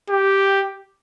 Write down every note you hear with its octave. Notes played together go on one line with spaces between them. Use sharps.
G4